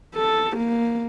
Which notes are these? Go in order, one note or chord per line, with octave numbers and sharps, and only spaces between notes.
A4
A#3